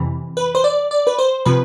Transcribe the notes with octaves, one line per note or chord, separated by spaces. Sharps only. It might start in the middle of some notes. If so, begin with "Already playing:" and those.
Already playing: F2 C3 E3
B4
C5
D5
D5
B4
C5
C3 F3 B4